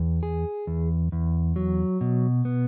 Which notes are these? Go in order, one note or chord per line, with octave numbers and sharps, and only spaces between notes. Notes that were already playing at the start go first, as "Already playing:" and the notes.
Already playing: E2
G#4
E2
E2
F#3
B2
B3